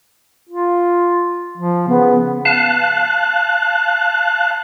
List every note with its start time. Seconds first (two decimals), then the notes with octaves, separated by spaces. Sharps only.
0.49 F4
1.57 F3
1.88 C#3 B3
2.45 F5 A5 F#6